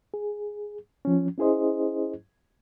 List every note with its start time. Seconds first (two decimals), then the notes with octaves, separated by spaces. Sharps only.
0.14 G#4
1.05 F3 C#4
1.38 C#4 E4 G#4 C5 D#5